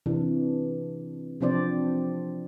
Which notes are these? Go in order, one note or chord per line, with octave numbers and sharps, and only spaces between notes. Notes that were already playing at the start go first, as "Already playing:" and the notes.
C3 E3 D4
C3 F3 C4 D4 C5 D5